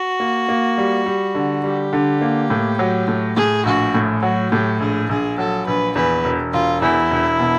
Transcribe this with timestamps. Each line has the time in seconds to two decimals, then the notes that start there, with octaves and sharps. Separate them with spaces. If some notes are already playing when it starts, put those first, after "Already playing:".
Already playing: F#4
0.20 A#3
0.49 A#3
0.78 G3
1.06 G3
1.35 D3
1.64 G3 G4
1.93 D3
2.21 A#3
2.50 A2
2.79 F#3
3.08 A2
3.36 A2 G#4
3.66 A#1 F#4
3.94 A2
4.22 F#3 F#4
4.51 A2 G4
4.80 A#1 G#4
5.09 A#1 G#4
5.38 F#3 A4
5.67 A#1 B4
5.95 E2 B4
6.24 E1
6.53 E1 F4
6.82 E2 E4
7.11 E1
7.39 B2